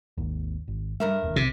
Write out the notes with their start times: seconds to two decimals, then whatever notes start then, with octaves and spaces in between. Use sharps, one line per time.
0.18 G#1 D#2
0.68 G#1
1.00 G2 G3 G#3 A#4 E5
1.22 E1 D#2
1.36 B1 C3